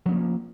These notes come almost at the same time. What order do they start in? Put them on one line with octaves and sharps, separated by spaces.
F3 C#4 A#3